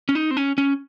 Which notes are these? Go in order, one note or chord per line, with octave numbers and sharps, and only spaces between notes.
C#4
D#4
C4
C#4
C#4